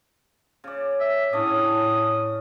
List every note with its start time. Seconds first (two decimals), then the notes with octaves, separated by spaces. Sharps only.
0.64 C#3 D5
1.00 E5
1.33 A2 C#3 C#4 D4 D#6